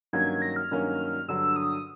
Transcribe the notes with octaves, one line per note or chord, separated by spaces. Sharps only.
G2 D#3 F#3 A#3 C#4 G#6
G#6
A#6
F6
G2 D#3 F#3 A#3 C#4
G2 D3 F#3 E6
D#6